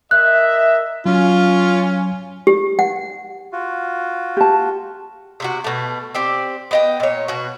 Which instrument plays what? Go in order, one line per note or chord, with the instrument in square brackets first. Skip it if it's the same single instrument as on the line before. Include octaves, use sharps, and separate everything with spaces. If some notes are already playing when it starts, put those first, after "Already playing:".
[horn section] A#4 D#5 E5 [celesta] F#6
[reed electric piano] F#3 [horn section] C#4 [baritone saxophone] F4
[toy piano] G4
F#5
[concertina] F4 F#4
[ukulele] G4 A5
[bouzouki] C3 E4 F#4
B2 A3
C4 G4 D5
B3 D#5 G5
A#2 C#5
B2 F#4